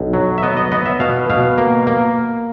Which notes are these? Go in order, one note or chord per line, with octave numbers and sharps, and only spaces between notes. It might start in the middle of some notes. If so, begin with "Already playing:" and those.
Already playing: B1
F#3
E5
B3 D#5
D#5
B3 D#5
E5
B2 F5
B2 F5
A#3
A#3